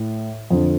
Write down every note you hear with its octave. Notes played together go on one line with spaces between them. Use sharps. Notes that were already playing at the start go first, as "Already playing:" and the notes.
Already playing: A2
F2 D3